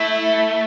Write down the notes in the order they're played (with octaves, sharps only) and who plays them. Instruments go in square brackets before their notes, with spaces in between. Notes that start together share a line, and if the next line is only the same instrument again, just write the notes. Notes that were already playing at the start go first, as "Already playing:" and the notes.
Already playing: [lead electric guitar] A3 [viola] E4